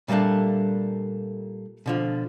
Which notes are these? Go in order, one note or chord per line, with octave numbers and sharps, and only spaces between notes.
A#2 G3 A3 A#3 D4
B2 D3 F3